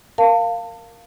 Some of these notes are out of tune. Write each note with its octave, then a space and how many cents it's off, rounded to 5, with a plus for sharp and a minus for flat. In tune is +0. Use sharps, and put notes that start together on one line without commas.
A#4 +0 F5 +0 A5 +35